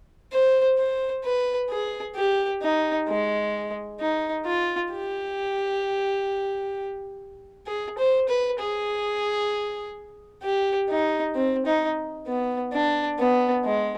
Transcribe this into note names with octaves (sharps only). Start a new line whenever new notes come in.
C5
C5
B4
G#4
G4
D#4
G#3
D#4
F4
G4
G#4
C5
B4
G#4
G4
D#4
C4
D#4
B3
D4
B3
G#3